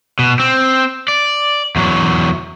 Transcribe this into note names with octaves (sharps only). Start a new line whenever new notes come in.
B2
C4
D5
E2 F#3